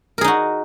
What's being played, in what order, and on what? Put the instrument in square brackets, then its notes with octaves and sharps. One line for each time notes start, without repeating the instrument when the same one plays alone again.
[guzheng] A#4
G#4
D#4
F#4